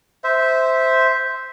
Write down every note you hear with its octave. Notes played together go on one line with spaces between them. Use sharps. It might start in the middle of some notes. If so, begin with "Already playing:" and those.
C5 E5